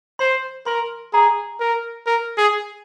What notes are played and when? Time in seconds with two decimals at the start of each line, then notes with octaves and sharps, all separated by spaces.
0.19 C5 C6
0.66 A#4 C6
1.13 G#4 A#5
1.60 A#4
2.06 A#4
2.37 G#4